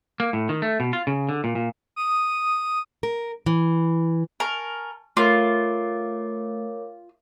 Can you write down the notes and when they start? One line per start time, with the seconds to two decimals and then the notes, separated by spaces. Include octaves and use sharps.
0.20 A#3
0.33 A2
0.49 D#3
0.62 A3
0.80 B2
0.93 F4
1.07 C#3
1.29 D3
1.44 A#2
1.55 A#2
1.96 D#6
3.03 A#4
3.46 E3
4.40 A#4 G#5 A5 C#6
5.17 A3 F4 A#4 C#5 D6